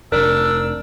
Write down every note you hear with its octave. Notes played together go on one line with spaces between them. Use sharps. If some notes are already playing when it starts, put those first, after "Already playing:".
F1 D4 A#4 E6